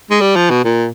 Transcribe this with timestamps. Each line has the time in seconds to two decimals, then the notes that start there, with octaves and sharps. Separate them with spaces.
0.10 G#3
0.21 G3
0.36 F3
0.50 B2
0.64 A#2